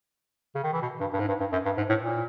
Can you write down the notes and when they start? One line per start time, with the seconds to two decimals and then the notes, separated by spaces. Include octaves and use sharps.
0.55 C#3
0.63 D#3
0.73 E3
0.82 B2
1.00 G2
1.13 G2
1.19 G#2
1.28 G2
1.40 G2
1.52 F#2
1.65 G2
1.77 G#2
1.89 A2
2.01 A#2